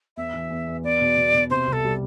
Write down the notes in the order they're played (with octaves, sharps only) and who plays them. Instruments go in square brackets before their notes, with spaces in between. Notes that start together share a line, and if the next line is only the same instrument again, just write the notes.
[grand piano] E2 [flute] E5
[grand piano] E3
E2
E2
[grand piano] B3 [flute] D5
[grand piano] B2
B2
B2
[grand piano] C3 [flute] C5
[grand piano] C2
[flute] A4
[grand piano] G3